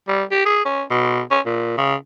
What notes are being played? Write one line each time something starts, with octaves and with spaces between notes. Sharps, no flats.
G3
G4
G#4
C#4
B2
C#4
A#2
C#3